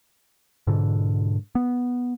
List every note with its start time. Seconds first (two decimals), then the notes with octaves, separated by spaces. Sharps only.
0.67 G#2 B2 D3
1.55 B3